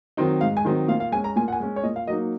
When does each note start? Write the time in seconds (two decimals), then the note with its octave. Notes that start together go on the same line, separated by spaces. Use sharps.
0.17 D#3 F#3 C4 D#4
0.41 G#2 F5
0.57 G#5
0.65 D#3 F#3 C4 D#4
0.88 A#2 F5
1.00 F5
1.12 G#3 C#4 G#5
1.24 A#5
1.36 A#2 G#5
1.48 F#5
1.52 G#5
1.60 G#3 C#4
1.76 C#5
1.83 A#2 D#5
1.96 F5
2.07 F#3 A#3 D#4 D#5